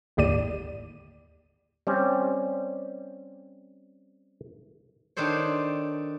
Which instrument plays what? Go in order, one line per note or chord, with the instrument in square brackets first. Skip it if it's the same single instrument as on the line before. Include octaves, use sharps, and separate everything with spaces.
[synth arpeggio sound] G1 D#2 A2 G4 D5 D#7
[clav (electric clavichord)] G3 C4 C#4
[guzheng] D#3 D4 A4 C5 C#5